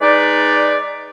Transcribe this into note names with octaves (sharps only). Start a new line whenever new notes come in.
G#3 D#4 B4 D5